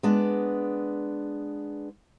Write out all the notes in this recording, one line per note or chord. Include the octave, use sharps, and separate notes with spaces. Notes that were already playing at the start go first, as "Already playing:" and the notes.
G#3 B3 D4